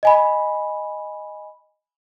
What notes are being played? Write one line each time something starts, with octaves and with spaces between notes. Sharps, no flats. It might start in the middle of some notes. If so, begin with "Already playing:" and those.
D#5 G#5 B5